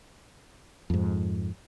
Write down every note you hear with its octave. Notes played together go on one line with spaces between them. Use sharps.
F2 G#2